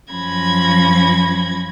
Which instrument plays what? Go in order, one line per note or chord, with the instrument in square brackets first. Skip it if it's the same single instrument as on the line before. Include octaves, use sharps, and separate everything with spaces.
[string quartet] F#2 F3 C#4 B5 G#6 A#6